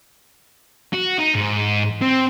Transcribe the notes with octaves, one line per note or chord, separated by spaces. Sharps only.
F#4
D#4
G#2
C4